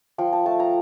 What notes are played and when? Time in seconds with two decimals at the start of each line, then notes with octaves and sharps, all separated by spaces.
0.18 F3 G5
0.33 A5
0.46 A3 A5
0.60 A#5